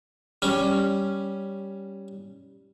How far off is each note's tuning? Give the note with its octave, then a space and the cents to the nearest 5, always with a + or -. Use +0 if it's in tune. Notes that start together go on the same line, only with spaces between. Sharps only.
G3 +0 C#4 +0